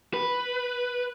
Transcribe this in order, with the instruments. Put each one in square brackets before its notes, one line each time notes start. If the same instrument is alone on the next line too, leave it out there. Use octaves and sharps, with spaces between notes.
[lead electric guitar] B4